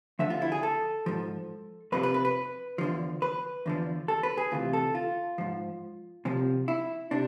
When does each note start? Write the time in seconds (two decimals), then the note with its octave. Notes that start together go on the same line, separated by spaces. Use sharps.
0.19 D2 D3 F3 E5
0.30 F4
0.42 E4
0.52 G#4
0.63 A4
1.06 G#2 F3
1.92 F2 C3 F3 B4
2.03 B4
2.14 B4
2.25 B4
2.78 E2 D3 F3
3.22 B4
3.66 E2 D3 F3
4.08 A4
4.23 B4
4.37 G#4
4.52 D2 C3 E3 F4
4.73 A4
4.95 F4
5.38 G#2 F3
6.25 C2 C3 F3
6.68 E4
7.11 C3 D4